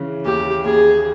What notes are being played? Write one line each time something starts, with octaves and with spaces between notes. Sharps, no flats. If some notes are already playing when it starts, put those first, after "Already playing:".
Already playing: C#3 E3
D#2 G4
D#2 G#4